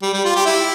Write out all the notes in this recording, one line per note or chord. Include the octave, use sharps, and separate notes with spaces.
G3
G3
F4
G4
E4